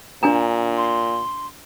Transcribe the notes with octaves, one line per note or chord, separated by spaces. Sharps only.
A#2 D4 G#5 A#5
C6